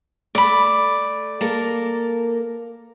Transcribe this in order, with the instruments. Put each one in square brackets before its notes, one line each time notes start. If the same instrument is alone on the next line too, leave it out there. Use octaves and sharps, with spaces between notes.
[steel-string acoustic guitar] A3 [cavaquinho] D5 B5
[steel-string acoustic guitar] A#3 A4 A#4